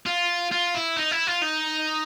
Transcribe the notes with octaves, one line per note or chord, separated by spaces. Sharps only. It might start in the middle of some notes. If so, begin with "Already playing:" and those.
F4
F4
E4
D#4
E4
F4
D#4